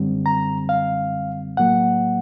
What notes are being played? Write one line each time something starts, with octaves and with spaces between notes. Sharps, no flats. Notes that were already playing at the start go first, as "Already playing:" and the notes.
Already playing: F#2 D3 G3 C4
A#5
F5
A2 F#3 A#3 F#5